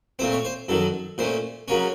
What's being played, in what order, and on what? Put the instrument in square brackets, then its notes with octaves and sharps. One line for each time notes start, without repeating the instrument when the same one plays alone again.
[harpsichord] A#2 A3 C4 C5
C#5
C5
F#2 D#3 F#3 A4
A#2 A3 C#4 C5
C#3 F#3 A#3 C#4 C#5